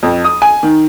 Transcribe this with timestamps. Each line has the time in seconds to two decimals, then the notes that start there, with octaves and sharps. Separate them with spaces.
0.03 F2
0.25 D#6
0.42 G#5
0.63 D#3